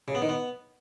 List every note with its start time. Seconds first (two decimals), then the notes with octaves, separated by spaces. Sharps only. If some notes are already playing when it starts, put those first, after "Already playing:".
0.08 C#3
0.15 B3
0.22 D#3
0.29 B3